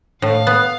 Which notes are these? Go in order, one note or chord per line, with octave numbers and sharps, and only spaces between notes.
A2 F5
B3